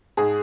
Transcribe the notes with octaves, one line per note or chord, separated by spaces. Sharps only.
G#2 G#4